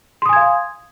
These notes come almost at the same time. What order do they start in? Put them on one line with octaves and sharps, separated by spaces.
C6 D#6 G#5 G#6 F5